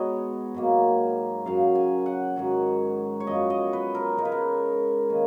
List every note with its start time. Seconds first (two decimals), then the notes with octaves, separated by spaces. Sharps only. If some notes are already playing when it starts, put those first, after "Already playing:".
Already playing: B2 G#3 B3 D#4 C#5 D#5
0.54 G#2 F#3 A#3
1.45 F#2 C#3 F#3 F5
1.75 G#5
2.06 F#5
2.36 G#2 D#3 F#3 C#4
3.20 C#5
3.27 F#2 F3 B3 D#5
3.50 D#5
3.73 B4
3.95 A#4
4.18 C#3 G#3 D#4 A#4
4.25 B4
4.32 A#4
5.09 D#3 A#3 C#4